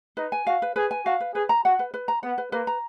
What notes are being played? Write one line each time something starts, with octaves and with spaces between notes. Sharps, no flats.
D#4 B4
G#5
F#4 F5
B4
G#4 B4
G#5
F#4 F5
B4
G#4 B4
A#5
F#4 F#5
B4
B4
A#5
B3 F#5
B4
A#3 B4
A#5